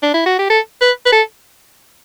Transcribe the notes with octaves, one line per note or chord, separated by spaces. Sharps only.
D4
E4
F#4
G4
A4
B4
B4
A4